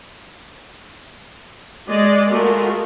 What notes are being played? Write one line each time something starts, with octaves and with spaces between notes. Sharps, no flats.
G#3 D5 D#5
G#3 A3 F4 F#4 A#4